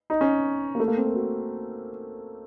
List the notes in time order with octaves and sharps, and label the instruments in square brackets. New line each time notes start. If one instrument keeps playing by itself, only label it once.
[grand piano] D#4
C#4
A#3
A3
A#3
C4
A#4
F#4